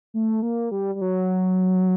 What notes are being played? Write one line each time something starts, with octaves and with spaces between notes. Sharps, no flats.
A3
A#3
G3
G3
F#3